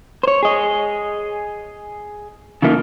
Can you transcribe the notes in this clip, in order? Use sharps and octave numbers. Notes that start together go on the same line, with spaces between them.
C5 C#5
G#4 D#5
C#3 E3 A3 A#3 D#4 F4